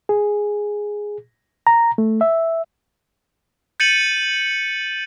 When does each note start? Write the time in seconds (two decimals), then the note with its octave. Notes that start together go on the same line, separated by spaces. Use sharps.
0.09 G#4
1.67 A#5
1.98 A3
2.21 E5
3.80 G6 A6 C#7 D#7 F#7